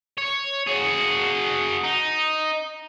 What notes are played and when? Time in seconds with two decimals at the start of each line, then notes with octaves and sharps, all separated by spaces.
0.18 C#5
0.67 F#4 G#4
1.84 D#4